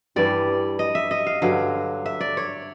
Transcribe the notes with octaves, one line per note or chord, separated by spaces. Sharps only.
G2 E3 G3 D5
D#5
E5
D#5
F5
G2 D3 F#3 F5
E5
D5
C#5